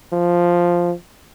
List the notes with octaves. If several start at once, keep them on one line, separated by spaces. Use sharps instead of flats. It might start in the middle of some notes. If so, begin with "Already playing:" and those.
F3